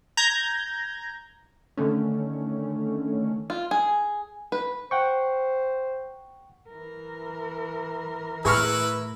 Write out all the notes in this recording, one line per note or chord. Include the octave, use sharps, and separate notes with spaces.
A#5 G6 G#6 A#6
D3 D#3 A3 C#4
F4
G#4
B4
C5 F#5 G5 C#6
E3 A#4
A2 E4 G#4 B4 E5 C#6 F6